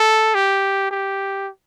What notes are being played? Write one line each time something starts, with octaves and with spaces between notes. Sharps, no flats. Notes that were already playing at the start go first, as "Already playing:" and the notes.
Already playing: A4
G4
G4